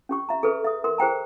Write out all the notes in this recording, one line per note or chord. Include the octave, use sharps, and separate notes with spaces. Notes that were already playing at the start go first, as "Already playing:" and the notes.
C#4 G4 C#6
E5 A#5
G#4 A4 B4
E5 D#6
A#4 C6
G#4 C5 G5 A#5